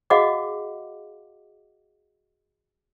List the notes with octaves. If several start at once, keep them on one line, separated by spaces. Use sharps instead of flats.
F#4 G#4 D#5 F5 F#5 D6